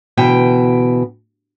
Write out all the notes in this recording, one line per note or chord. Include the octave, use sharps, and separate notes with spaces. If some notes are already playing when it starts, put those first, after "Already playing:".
D2 B2 E3 G5